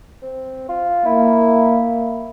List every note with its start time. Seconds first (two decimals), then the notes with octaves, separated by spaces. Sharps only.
0.22 C4
0.69 F4
1.06 A#3 E4